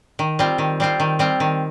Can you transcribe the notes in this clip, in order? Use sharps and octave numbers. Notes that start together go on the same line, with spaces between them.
D#3
G3 C4 F4
D#3
G3 C4 F4
D#3
G3 C4 F4
D#3